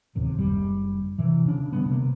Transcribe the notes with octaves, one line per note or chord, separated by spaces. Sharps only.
D1 D#2 C3
F#1 G3
C3 E3
C#3 D4
D3 G3 B3
C3 A#3